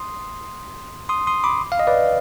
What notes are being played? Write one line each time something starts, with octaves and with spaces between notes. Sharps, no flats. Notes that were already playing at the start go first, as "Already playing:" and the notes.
Already playing: C6 D#6
C6 D#6
C6 D#6
B5 D6
F5
D#5
B4 D5